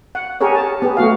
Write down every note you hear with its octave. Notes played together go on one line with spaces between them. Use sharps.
F#5
G4 G#4 A#4 C#5
A5
B3 G4 G#4
A3 F#4 F5